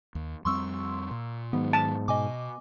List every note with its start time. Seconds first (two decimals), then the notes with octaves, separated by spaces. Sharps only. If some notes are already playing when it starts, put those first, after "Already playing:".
0.15 D#2
0.45 F2 G3 C4 C6 C#6 E6
1.11 A#2
1.53 G#2 D#3 F#3 B3
1.73 A5
2.08 B2 D#5 G#5 D6